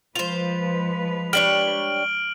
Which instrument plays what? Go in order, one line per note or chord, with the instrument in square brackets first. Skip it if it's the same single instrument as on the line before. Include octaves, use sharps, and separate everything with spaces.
[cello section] F3 G#3 B4 [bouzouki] F4 C5 [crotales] F7
[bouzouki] G3 D4 C#5 [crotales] F6 D7 F#7